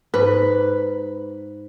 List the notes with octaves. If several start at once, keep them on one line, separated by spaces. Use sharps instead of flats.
G#2 B4